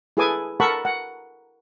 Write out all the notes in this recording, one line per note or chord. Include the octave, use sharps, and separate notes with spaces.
E4 G#4 A4 B4 G#5 D6
A4 A#4 F#5 A5 B5 C#6
F#5